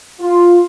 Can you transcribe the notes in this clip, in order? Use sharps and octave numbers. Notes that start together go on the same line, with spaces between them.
F4